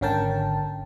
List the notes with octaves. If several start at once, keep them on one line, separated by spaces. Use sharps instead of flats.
G#1 D3 C#4 A#4 G5 A5